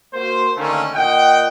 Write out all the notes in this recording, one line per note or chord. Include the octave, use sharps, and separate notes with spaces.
A#3 F#4 C5
D3 D#3 A3 A#3 C#4
A#2 D#5 F#5 G5